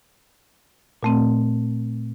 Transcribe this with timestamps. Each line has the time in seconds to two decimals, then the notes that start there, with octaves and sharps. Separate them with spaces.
1.03 A#2 A3 C4